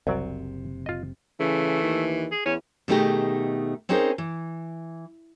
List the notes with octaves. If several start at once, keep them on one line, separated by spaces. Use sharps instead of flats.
F#1 C2 C3 F#3 D5
F4 D#5
C#3 E3 A3
D#2
G#4
E2 C#4
B2 D#3 A3 D#4 G4 G#4
C4 C#4 D#4 G#4 A#4 C5
E3